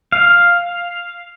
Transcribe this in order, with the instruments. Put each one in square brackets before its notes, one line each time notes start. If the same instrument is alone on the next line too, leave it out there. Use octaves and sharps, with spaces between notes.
[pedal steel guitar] F5